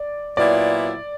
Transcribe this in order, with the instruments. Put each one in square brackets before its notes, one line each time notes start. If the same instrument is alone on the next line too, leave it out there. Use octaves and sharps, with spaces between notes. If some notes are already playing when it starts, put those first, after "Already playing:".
Already playing: [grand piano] D5
[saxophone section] A#2 F#3 B3 E4 [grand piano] D5